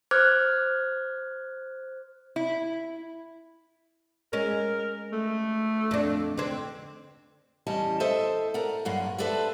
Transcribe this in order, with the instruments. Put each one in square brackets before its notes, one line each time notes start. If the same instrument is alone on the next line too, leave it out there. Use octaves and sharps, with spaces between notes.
[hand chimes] C5 D6 F6 F#6 G#6
[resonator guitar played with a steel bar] E4
[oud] G#3 C#4 [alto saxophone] A#4
[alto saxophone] A3
[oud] F2 D4
D3 C4
[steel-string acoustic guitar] E2 G3 C#4 D#5 A5
A4 C5 D#5 E5 A5
A#4 D5 F#5
G2 D3 F#3 A#3 F#5
D4 A4 B4 C5 D5 E5